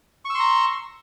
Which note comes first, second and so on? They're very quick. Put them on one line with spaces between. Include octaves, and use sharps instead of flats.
C#6 E6 C6 A#5